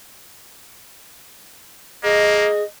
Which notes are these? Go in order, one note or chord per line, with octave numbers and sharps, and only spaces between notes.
A#3 G#4 D#5